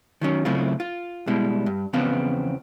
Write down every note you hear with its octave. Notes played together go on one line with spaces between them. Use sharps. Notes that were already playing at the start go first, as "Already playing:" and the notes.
D#3 F#3 C#4
C#3 F#3 A3 C4 E4 F4
F4
B2 G3 G#3 E4
G2
E2 C#3 F3 B3 C4 F5